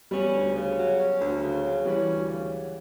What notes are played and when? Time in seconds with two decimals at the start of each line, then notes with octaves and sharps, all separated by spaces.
0.11 G3 B3 C#4
0.32 D2
0.55 C#3
0.77 F#3
0.99 C#4
1.20 D2
1.42 C#3
1.63 F#3
1.85 E3 G3 C#4
2.07 D2
2.28 C#3
2.50 F#3